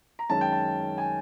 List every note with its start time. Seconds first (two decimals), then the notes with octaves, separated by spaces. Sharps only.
0.19 A#5
0.29 F#2 D#3 G#3 C#4 A5
0.41 G5
0.52 A5
0.98 G#5